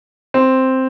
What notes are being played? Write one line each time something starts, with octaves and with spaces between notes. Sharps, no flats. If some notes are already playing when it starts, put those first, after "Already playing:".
C4